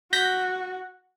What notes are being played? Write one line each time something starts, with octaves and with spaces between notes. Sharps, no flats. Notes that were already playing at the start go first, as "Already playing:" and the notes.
F#4 G6 A#6 B6